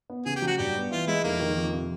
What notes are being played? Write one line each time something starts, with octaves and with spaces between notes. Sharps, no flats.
B3
C#3 G#4
G4
F#3
F#4
G2 G4
B3
E3 F4
G#3 E4
F1 A#3
D#3
F2
C3